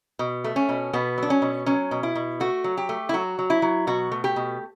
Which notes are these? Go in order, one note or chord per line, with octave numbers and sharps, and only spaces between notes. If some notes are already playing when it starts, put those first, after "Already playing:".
B2
A3
C#4
B2
B2 B3
F#3 D4
C#4
B2
F#3 C#4
B2
E4
B2
A3 F#4
F#3
G4
A3
E4
F#3 F#4
F#3
E4
F#3
B2 F#4
A3
G4
B2